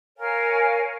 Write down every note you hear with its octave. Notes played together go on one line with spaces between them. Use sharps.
A#4 C#5 F5 G#5